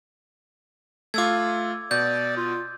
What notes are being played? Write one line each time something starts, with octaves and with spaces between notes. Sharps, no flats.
A3 F4 D6 E6 G#6
B2 D5 G6
F4